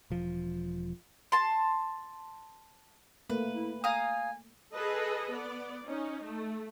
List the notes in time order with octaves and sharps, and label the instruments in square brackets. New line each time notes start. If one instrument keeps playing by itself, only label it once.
[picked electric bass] E1 F3
[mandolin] A5 C6
[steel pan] A3 A#3 [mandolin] B4
[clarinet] E4
[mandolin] F5 A#5 D#6 [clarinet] G#5
[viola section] G#4 A4 B4 D#5
B3 D5
C#4 D#4
A3